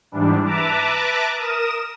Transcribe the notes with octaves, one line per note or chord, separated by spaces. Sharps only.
G#2 E3 G3 D4
B4 E5 A5 A#5 D6
A#4 D#6 E7